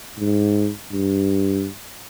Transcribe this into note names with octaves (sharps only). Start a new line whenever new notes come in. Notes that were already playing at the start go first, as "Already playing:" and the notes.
G#2
G2